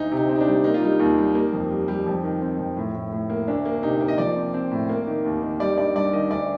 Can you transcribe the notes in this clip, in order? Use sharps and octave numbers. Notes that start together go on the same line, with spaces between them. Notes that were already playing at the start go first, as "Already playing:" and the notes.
Already playing: D2 D#4
C3
D#4
C4
D#4
D4
G3
A#3 D#4
F4
G3 D#4
D#2
G3
A#3
F2
G3
G3
F2
D#3
C4
F2
A2
A2
A2
A#3
D2 D4
A#3
C3 D#4
A#3
D#5
F3 D5
C4
C4
A2
A#3
D#3
D#2
D#3
G3 D5
G2 D5
G2 D5
D#3 D#5
D2 D5